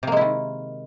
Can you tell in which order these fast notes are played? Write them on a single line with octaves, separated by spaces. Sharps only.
C3 A#3 G#3 E4 D#3